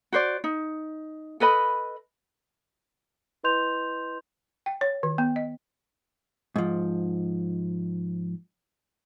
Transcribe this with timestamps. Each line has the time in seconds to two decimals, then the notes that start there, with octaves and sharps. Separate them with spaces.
0.13 F#4 C5 D5
0.44 D#4
1.40 A4 B4 D#5 B5
3.44 E4 B4 D#5 C6 G6 F7
4.66 G5
4.81 C#5
5.03 D#3
5.18 B3
5.36 D#5
6.56 G#2 F3